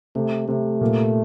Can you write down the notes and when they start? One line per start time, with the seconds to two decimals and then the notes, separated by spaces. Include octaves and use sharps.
0.15 C3 A3
0.48 C3 A3
0.81 A#2